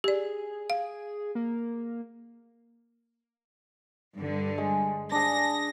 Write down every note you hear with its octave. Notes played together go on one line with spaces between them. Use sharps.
G4 G#4 D5
F5
A#3
G2 D3
G#3
D4 G#4 A#6